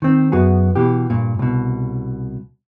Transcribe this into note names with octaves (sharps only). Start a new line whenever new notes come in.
D#3 C4
F#2 B3 F#4 G#4
B2 E3 G4
G2 A#2
C2 B2